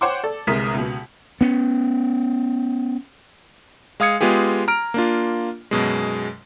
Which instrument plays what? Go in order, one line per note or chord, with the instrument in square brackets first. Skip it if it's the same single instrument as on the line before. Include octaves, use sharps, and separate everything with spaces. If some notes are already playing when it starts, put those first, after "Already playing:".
[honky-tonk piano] C5 C#5 F#5 G5 C6 D6
A4 D5
G1 C2 G#3 A#4 D#6 B6
C#2 B2
[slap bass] B3 C#4
[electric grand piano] G#3 F5 D#6 G#6 C#7
G#3 B3 F4 G4 G#4
A#5 F6 D7
A#3 D4 F4
F#2 B2 G#3